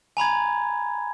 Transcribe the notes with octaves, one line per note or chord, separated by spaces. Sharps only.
G#5 A#5 B5 G#6